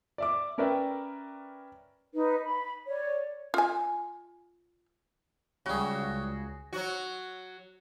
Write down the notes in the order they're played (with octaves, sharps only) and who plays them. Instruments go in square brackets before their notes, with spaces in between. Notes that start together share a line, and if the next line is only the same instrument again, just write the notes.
[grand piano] D5 E5 D6
C#4 A#4 B4 D5 E5 G5
[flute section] D#4 B4
B5
C#5 D5
[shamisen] F4 G#5
[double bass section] C#2 [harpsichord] C#3 G3 [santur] F#4 G#4
[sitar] F#3 F#4